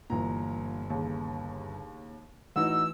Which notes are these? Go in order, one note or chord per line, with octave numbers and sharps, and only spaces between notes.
G1 A#2 E3 A#5
D#2 C#3
A1 E3 D#4 F#4 E6